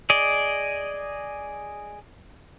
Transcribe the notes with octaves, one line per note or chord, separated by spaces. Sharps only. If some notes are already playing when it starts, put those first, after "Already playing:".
G#4 D5 D#5